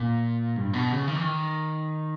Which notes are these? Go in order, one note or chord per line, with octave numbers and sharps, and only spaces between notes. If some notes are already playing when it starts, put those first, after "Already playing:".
Already playing: A#2
G2
B2
C#3
D#3
E3
D#3